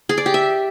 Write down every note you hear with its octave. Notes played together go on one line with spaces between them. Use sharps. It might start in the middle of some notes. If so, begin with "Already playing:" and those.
G#4
D5
G4
E5